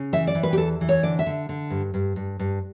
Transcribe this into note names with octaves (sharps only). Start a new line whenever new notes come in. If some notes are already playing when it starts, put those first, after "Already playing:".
Already playing: C#3
E3 E5
D5
E3
B4
G4
E2 A4
E3
C#5
D3 D5
E5
D3
D3
G2
G2
G2
G2